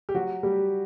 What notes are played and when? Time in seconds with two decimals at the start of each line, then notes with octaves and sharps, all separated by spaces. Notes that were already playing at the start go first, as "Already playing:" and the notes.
0.09 G4
0.14 F#3 F#4
0.43 G3 G4